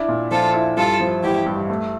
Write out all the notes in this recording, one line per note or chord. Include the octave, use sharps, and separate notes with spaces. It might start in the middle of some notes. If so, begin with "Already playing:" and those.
Already playing: D4 E4
A#2
F3 F4 A4
E4
G2 F4 A4
F3
A1 E4 G4
G2
A3